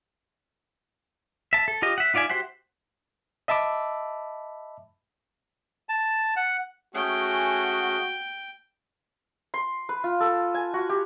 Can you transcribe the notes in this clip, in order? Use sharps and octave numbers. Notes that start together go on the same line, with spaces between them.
E5 A5
A4
F4 G4 D#5
E5 F#5
D#4 F4 D5 E5 G#5
F#4 G4 C5 E5 F#5
D#5 E5 A5 B5 D6 E6
A5
F#5
A3 C#4 F#4 G#4 G5
C6
B4
F4
A4
G#5
F#4
G4